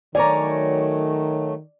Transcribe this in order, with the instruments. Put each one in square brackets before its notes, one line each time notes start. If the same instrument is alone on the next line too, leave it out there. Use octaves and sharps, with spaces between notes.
[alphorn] D#3 [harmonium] F#3 A3 [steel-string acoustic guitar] A#4 C#5 G#5 [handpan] D5